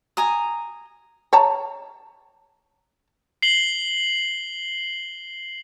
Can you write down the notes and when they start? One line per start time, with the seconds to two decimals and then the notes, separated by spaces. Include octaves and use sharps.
0.17 G#5 A#5 D#6
1.33 C#5 A5 A#5
3.42 C7 F#7 G7